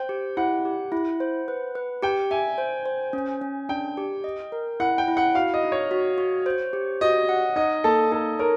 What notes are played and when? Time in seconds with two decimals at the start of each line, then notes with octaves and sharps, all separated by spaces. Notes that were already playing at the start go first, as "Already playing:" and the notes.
Already playing: C5 G5
0.09 G4
0.37 E4 F#5
0.65 G4
0.92 E4
1.20 C5
1.48 B4
1.75 B4
2.02 G4 G5
2.31 E5 G#5
2.58 C5
2.85 C5
3.13 C#4
3.41 C#4
3.69 D4 G5
3.97 G4
4.24 D#5
4.52 A#4
4.80 E4 F#5
4.98 G5
5.08 E4
5.17 F#5
5.35 F#4 F5
5.54 D#5
5.63 D#4
5.72 C#5
5.91 F#4
6.18 F#4
6.46 C5
6.73 G4
7.01 F#4 D#5
7.29 F#5
7.56 D#4 D#5
7.84 A#3 A4
8.12 D#4 A4
8.39 A#4 C#5